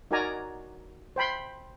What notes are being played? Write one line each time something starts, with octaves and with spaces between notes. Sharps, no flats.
D#4 F#4 A#4 D5 G#5 A#5
C5 G5 B5 C6